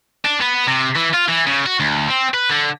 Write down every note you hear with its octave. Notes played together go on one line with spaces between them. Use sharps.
D4
B3
C3
E3
F4
E3
C#3
F#4
D2
C4
B4
D3